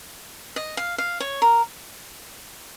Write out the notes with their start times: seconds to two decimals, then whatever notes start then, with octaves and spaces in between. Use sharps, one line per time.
0.56 D#5
0.77 F5
0.98 F5
1.20 C#5
1.42 A#4